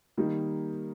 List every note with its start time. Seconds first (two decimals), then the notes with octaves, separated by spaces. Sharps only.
0.17 D#3 G3 A#3 D#4